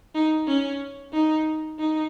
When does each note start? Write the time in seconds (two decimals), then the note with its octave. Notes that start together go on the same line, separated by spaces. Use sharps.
0.15 D#4
0.47 C#4
1.13 D#4
1.79 D#4